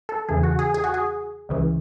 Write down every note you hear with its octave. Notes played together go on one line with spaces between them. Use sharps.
A4
E2 C#3 E3 G#4
F#4
G#4
G#4
F#4
G#4
C#2 C#3 E3